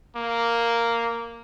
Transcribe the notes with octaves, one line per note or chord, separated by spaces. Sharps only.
A#3